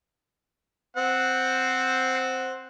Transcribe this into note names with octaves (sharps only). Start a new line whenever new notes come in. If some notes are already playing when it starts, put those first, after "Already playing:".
C4 C5 F#5